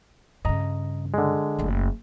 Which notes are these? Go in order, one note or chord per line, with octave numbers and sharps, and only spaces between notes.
G2 C#3 D#5 A#5
D3 G#3
F#1 A3